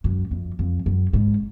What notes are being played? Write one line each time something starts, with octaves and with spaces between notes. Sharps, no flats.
F#2
F2
F2
F#2
G#2